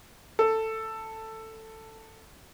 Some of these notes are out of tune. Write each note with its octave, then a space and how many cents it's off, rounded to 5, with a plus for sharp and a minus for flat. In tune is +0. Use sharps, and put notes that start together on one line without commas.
A4 +10